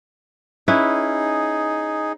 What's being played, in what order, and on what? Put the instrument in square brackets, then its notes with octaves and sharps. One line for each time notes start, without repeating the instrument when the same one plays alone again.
[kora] C#4 E4 B4 [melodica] D#4 G#4